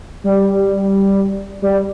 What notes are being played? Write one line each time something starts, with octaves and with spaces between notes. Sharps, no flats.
G3
G3